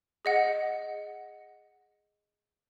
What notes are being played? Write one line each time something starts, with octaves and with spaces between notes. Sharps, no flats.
G#4 D#5 F#5